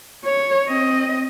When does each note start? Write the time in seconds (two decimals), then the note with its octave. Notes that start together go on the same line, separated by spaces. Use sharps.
0.25 C#5
0.66 C4 D#5